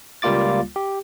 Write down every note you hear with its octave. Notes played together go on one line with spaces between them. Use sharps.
C#2 G3 A#3 F4 D6 A6
G4